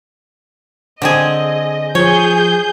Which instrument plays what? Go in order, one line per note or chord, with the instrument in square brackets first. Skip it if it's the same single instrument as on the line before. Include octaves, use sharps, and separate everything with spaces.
[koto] D3 C4 G#4 [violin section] D#5
[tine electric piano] F3 [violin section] G#4 G6 [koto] C#5